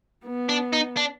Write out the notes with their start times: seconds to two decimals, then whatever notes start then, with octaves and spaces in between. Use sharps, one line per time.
0.25 B3
0.49 D4
0.73 D#4
0.97 D4